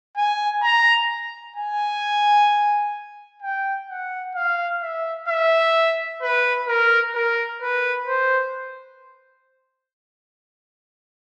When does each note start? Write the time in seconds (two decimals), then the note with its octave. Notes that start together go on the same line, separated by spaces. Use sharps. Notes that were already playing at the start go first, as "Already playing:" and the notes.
0.17 G#5
0.63 A#5
1.56 G#5
3.42 G5
3.90 F#5
4.35 F5
4.82 E5
5.29 E5
6.22 B4
6.68 A#4
7.15 A#4
7.62 B4
8.07 C5